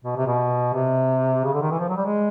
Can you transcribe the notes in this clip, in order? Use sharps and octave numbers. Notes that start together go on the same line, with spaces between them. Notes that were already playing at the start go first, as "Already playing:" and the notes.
B2
C3
B2
C3
C#3
D3
D#3
E3
F3
F#3
G3
G#3